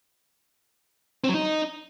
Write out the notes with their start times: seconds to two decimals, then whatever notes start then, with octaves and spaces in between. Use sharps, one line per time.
1.24 C4
1.29 F#3
1.34 D#4